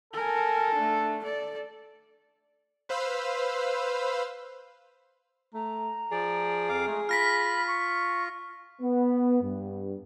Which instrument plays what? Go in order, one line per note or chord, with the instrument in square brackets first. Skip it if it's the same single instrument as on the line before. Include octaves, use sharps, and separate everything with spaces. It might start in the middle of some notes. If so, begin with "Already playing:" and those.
[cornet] A4 [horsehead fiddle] A#4 G#5
[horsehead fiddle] A3 D4
A4 D5
[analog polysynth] B4 C5 F5 B5 E6
[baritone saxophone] A3 [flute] A#5
[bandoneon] F3 D5 [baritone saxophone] G#4
[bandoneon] F2 F5 D6
G#3 A3
[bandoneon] F4 [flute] B5 [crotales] F6 A#6 B6
[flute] C#6
[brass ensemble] B3
G2